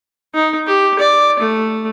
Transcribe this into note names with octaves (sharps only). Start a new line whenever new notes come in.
D#4
G4
D5
A3